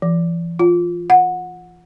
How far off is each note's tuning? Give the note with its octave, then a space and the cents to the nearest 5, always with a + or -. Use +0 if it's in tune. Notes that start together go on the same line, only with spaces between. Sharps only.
E3 +45
F4 +0
F#5 -20